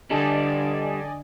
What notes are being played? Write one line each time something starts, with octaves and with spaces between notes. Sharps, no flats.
D3 G3 D4 A4 D5 D#5 G#5